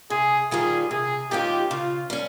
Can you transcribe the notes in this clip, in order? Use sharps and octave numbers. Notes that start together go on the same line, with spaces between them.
C3 G#4
D#3 G3 C#4 F4 G#4
C3 G#4
D#3 G#3 C#4 F4 G4
C#3 F4
G3 C#4